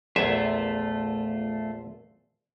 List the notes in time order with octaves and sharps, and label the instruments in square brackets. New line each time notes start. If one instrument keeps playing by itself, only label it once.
[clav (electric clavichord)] A#1 E2 E5 [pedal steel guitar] A3 F4